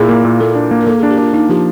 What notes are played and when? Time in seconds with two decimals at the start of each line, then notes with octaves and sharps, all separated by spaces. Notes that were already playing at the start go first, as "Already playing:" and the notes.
Already playing: A#2 E4 G#4
0.09 A#3
0.25 A#2
0.40 A#3 A4
0.55 D4
0.71 A#3
0.80 A#4
0.87 A#3 A4
0.99 D4 G#4
1.11 G4
1.18 D4 F4
1.33 A#3 D#4
1.49 F3 G4